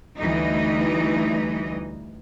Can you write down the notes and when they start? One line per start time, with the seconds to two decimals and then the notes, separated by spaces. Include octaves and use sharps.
0.17 D2 E3 G3 D#4 D#5